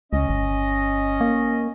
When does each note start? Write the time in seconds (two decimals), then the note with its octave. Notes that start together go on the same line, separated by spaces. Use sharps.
0.13 C#2 C#4 D#5
0.29 G1
1.21 A#3